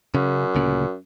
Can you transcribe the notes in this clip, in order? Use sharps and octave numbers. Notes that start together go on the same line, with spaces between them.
F#2 C#3
D2 A#2 C#3